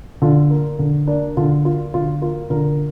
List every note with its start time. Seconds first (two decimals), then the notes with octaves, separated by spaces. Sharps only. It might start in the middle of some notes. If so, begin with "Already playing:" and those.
0.22 D3 F4
0.51 A#3
0.79 D3
1.07 A#3 D4
1.37 D3 F4
1.65 A#3 F4
1.94 D3 F4
2.22 A#3 F4
2.50 D3 F4 A#4